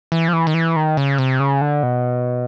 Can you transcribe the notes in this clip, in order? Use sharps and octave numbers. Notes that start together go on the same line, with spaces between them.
E3
F3
E3
D#3
E3
D#3
C#3
C3
C#3
D3
B2